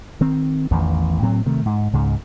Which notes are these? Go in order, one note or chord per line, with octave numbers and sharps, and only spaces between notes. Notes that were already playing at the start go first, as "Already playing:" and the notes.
D#3 C4
A1 E2 D#3 E3
A2 F#3 C4
C3 D#3 A3
G#2
C#2 G#2 C#3